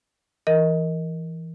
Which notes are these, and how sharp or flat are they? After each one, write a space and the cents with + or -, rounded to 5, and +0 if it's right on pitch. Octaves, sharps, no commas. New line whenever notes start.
E3 +0 A#4 +0 D#5 +15